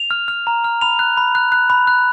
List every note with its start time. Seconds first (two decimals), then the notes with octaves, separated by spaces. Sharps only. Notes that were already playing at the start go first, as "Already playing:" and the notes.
Already playing: F7
0.11 F6
0.28 F6
0.47 A#5
0.64 F6
0.81 B5 F7
0.99 F#6
1.17 B5
1.35 F#6
1.52 F#6
1.70 B5
1.87 F#6